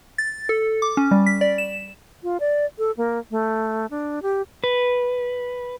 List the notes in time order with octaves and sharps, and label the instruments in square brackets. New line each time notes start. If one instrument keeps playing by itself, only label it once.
[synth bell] A6
A4
D6
C#4
G3
B6
D5
E7
[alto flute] F4
D5
A4
A#3
A3
D4
G4
[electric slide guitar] B4